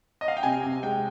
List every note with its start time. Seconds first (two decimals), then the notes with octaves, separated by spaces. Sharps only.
0.21 D#5
0.28 F5
0.37 G5
0.43 C3 G#5
0.64 C3
0.83 G#3 G5